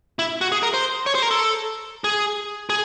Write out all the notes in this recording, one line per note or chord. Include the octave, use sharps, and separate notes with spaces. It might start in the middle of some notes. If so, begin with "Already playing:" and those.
E4
F#4
G#4
A#4
C5
C#5
C5
A#4
A4
G#4
G#4